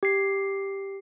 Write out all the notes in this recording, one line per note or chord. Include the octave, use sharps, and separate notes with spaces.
G4 C7